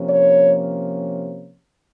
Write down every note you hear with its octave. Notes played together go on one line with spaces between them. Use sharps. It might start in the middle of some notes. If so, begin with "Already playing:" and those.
Already playing: C3 F3 A#3 C#4
C#5